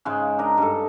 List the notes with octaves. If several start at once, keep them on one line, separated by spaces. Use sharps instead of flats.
G#2 C#3 G#3
D4 A#4 D#5
G2 A4